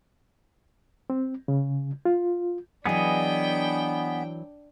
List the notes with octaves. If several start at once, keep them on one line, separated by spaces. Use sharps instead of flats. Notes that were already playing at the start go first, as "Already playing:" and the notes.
C4
C#3
F4
E3 F#3 B3 D4 G#4 D#5 G5